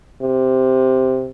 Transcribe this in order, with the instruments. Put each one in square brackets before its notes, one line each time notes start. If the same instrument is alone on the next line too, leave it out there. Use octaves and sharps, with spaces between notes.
[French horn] C3